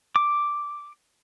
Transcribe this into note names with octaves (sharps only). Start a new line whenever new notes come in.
D6